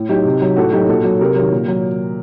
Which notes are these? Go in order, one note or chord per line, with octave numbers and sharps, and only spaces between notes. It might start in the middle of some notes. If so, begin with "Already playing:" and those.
Already playing: A2
F#3 D#4 G4
C3
F#3
A2 F#4 A4
F#3 D#4 G4
A#2 F#4 A4
F#3
C3 G4 A#4
D#3 F#3
A#2
F#3